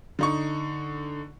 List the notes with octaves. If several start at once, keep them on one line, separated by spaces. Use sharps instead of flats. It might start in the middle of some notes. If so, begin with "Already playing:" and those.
D3 D#4 C#6